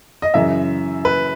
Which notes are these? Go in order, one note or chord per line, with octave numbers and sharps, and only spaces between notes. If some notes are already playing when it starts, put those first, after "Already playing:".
D#5
F#2 C#3 E3 E5
B4